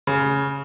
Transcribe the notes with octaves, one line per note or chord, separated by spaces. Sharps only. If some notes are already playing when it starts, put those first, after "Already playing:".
C#3